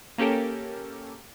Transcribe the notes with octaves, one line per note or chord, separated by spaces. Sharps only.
A#3 C#4 G4 A4 A#4